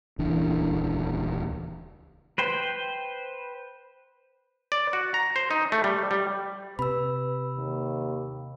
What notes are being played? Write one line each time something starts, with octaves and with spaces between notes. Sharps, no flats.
D#1 C#2 E3 D4
B4 C5 G5
D5
F#4
A#5
C5
D#4
A3
G3
G3
C3 B4 B5 E6
D#2